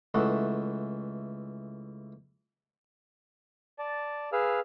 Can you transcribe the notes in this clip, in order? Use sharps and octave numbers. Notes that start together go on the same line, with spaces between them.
C#2 E3 A3 F#5
D5 A5
G#4 B4 F5 E6 F6